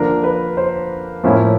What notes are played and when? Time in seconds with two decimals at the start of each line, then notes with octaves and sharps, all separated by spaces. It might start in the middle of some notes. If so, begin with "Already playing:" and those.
Already playing: D3 F3 A#3 D4 A#4
0.23 B4
0.57 C5
1.24 A2 F3 A#3 C#4 E4